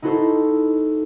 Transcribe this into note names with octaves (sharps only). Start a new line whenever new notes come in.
D#4 E4 F#4 A4 C5